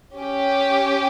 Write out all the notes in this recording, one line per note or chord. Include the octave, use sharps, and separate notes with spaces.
C#4 G4